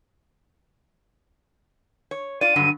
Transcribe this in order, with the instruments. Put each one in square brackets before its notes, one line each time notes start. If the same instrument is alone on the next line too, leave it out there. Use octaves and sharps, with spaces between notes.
[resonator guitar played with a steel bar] C#5
[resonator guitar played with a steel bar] F4 D5 [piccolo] D#7
[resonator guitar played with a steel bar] G2 D3 F#3